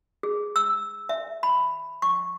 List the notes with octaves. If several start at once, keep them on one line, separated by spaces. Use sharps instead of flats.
G#4
E6
E5
B5
C#6